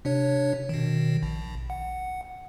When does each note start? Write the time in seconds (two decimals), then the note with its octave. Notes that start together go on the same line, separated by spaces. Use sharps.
0.05 C3 D4 C#5
0.69 B2 D#3
1.23 A#1
1.70 F#5